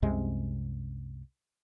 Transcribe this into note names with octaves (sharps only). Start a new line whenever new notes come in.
C2 F#2 C3 G#3